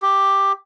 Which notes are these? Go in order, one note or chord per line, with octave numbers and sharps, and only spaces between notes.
G4